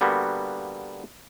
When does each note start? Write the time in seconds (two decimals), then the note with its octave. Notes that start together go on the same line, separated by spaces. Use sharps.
0.01 D3 G3 A#3 B3 F#4